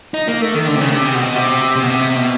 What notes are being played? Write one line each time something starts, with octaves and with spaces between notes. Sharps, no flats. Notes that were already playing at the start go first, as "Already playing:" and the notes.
D#4
A#3
A3
D#3
D3
C3
C#3
C3
B2
C3
C3
B2
C3
B2